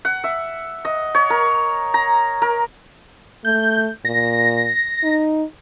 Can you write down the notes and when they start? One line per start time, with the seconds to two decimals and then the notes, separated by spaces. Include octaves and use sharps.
0.05 F#5
0.24 E5
0.85 D#5
1.15 C#5
1.30 A#4
1.94 A#5
2.42 A#4
3.45 A3 G6
4.05 A#2 A#6
5.03 D#4